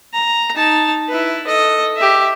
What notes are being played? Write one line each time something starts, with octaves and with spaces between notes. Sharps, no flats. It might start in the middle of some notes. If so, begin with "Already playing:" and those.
A#5
D#4 A5
E4 B4
A4 D#5
G4 E5